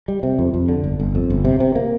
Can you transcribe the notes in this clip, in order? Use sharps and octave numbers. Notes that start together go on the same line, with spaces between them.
G3
C3
F2
F2
D3
G1
G1
F2
G1
C3
C3
A#3